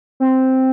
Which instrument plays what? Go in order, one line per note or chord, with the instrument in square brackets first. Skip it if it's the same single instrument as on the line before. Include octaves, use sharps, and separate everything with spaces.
[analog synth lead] C4